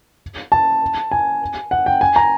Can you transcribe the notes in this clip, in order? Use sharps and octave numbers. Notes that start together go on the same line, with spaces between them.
A5
G#5
F#5
G5
G#5
A#5